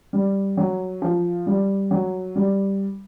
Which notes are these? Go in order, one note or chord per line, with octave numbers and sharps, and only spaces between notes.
G3
F#3
F3
G3
F#3
G3